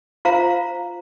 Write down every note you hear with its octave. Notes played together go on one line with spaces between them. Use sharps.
F4 C5 F5 A#5